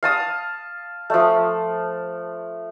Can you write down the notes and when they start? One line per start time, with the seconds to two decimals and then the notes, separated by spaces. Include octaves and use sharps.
0.03 F5 A5 D#6
1.10 F3 A3